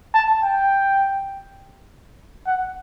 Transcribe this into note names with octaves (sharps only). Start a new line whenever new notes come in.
A5
G5
F#5